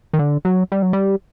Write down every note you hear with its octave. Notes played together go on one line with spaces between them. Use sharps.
D#3
D3
F#3
G3
F#3
G3